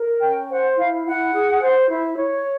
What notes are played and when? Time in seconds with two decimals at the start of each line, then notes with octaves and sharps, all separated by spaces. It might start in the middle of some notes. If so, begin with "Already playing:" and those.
Already playing: A#4
0.22 C#4 G5
0.49 C5 F#5
0.77 E4 F5
1.05 E4 F#5
1.33 G#4
1.61 C5
1.88 E4
2.17 C#5